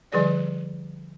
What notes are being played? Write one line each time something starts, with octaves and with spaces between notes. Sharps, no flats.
D3 F3 G3 G#4 D5 D#5